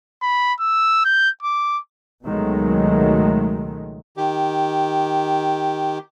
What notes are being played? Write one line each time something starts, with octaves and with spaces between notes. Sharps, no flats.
B5
E6
G6
D6
C#2 B2 D#3 F#3 G#3 A3
D#3 G4